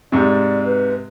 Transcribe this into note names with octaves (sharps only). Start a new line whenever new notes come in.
G#2 C3 D5
B4